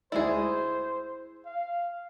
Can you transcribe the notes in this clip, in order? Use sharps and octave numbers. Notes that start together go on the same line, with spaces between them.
D2 G#3 E4 G#4 C5 D5
F5